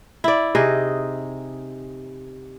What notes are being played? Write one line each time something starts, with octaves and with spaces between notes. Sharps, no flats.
E4 D5
C3 D#4 G#4